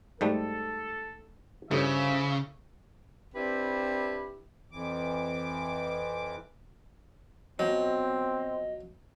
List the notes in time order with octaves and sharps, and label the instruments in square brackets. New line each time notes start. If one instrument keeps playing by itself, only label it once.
[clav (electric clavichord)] G#2 G3 A3 [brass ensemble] A4
[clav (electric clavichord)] G2 [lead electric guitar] C#3 [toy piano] E4 A4 C#5 [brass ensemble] F4 C5 E5
[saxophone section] C4 D4 E4 G4 B4
[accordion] F2 E3 D6
[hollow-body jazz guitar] B2 F3 [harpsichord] F#3 [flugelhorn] C4 [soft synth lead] D#5